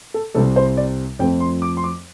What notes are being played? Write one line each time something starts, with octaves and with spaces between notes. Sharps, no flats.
A4
C2 C3 G3 C4 A4
C5
D5
F2 F3 A3 C4 G5
C6
D6
C6
D6